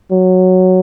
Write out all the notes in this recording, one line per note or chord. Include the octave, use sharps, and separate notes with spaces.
F#3